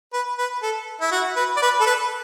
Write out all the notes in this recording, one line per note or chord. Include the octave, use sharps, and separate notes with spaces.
B4
B4
A4
E4
F#4
B4
D5
B4
A4
B4